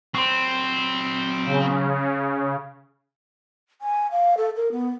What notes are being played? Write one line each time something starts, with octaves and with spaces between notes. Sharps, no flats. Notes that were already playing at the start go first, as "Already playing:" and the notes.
F#3 C4 C5
C#3
G#5
F5
A4
A#4
B3